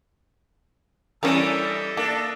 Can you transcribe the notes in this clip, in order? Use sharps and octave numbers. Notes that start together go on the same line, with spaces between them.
E3 G3 C#4 D4 A4 A#4 D#5 E5
A#3 D4